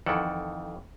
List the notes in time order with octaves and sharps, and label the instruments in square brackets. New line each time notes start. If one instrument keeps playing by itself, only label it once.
[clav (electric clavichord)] F2 D#3 E3 A4 F#5